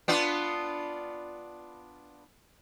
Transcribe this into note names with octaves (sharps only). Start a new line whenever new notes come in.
B3 D4 F4